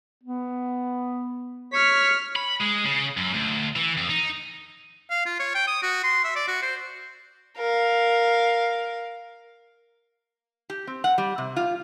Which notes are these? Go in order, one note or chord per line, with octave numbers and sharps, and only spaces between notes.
B3
C#5 F6 B6
B5
G#3
C#3
F#2
D2
E3
F2
D#4
F5
F4
C#5
G5
D#6
F#4
C6
E5
D5
F#4
C5
A#4 F5
G4
C4
F#5
G3
C3
F4